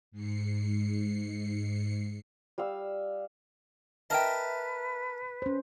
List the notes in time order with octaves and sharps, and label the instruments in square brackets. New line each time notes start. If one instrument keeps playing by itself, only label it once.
[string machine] G#2 C7 C#7
[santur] G3 F5 D#6 E6
[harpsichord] A#4 A5 [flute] B4 [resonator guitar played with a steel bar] D#5 E5 G5
[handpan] C#4 C5